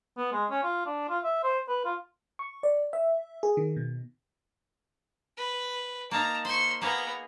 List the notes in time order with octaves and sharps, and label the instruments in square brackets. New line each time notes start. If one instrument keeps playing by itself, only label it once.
[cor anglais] B3
G#3
C#4
F4
D4
F4
E5
C5
B4
F4
[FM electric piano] C#6
D5
E5
G#4
D#3
B2
[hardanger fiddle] B4
[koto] A#3 D#4 [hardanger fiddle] A5 A#5
[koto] C5 [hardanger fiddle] C6 C#6
[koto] A#3 G#4 [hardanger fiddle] B3 A#5